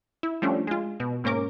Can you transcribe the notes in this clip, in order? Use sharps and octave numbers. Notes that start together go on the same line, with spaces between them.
E4
F3 G3 A3 C#4 D4
G#3 F4
B2
G#2 A#3 C#4 A#4 D6